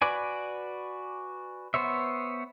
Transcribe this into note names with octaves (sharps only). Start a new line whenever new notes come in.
F#4 B4 D5 G#5
B3 C5 C#5 E5